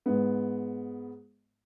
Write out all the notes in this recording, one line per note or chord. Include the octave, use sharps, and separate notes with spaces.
G#2 B3